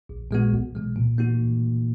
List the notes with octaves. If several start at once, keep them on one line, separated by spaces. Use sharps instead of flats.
A#1
A#2 G#3 B3 F#4
B1
B2 G#3
A#2
A#3 D#4 F#4